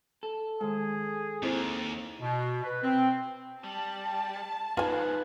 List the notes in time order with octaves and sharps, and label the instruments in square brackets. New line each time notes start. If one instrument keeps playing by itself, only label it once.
[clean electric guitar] A4
[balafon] D#3 G#3 [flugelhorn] G#4
[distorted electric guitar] D#2 [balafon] C4 E4 C5
[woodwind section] B2
B4
C4
[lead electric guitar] G3 [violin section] A5
[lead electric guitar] F3 G#3 [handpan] D#4 B4 [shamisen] F4 G#5